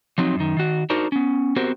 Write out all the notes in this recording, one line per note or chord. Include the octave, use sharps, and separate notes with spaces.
F3 F#3 C4 D#4
F#2 D#3
D#3 F#4
D4 D#4 F#4 A#4 C5
B3 C#4
B3 C4 F#4 G4 A#4 C5